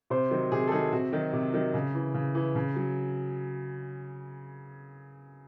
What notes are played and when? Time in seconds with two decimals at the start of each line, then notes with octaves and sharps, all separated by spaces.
0.10 C3 C5
0.31 D#3 F#3
0.52 C3 G#4
0.67 A4
0.72 D#3 F#3 G#4
0.92 C3 F#4
1.13 D#3 F#3
1.33 C3
1.53 D#3 F#3
1.74 C#3
1.94 E3
2.14 C#3
2.35 E3
2.55 C#3
2.76 F#3